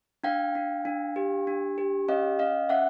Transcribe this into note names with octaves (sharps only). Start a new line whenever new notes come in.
D4 F5 G5
D4
D4
G4
D4
G4
C#4 D#5 F5
C#4 D#5 F5
C#4 E5 F#5